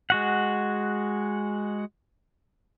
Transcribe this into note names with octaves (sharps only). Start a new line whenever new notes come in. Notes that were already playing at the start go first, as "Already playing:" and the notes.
G#3 F#4 F#5